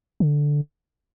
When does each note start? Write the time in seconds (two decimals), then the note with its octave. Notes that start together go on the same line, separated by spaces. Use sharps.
0.20 D3